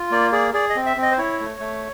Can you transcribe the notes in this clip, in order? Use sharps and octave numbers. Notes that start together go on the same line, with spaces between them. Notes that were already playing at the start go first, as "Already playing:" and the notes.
Already playing: F4
A#3 D5
G#4 D5
G#4 D5
D#5
C4
E5
C4
D#5
C5
E4 C#5
A3
A3